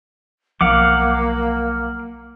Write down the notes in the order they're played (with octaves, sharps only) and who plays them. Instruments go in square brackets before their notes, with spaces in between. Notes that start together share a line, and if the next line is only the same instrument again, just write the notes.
[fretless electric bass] B1 F3 [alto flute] A#3 [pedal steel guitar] F5 F#5 D6